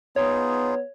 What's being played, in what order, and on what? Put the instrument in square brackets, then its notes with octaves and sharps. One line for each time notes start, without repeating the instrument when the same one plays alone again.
[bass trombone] B3 [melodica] D#4 F4 G#4 [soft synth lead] C#5